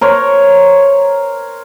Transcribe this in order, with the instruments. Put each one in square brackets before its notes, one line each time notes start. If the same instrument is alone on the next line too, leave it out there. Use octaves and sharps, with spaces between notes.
[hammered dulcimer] A#4 C5 C#5